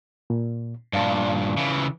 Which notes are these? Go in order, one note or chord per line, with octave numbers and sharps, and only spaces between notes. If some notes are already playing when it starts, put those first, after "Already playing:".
A#2
G2 A#2 D5 F5 A5
C#3 E3